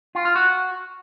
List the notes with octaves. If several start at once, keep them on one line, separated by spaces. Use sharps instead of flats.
F4
F4
F#4